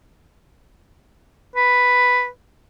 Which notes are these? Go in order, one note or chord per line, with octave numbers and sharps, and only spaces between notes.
B4